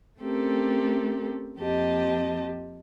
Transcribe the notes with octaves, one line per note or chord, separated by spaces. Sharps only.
A3 C4 C#4 G4 A4 A#4
F2 A#3 C4 G4 D#5 A5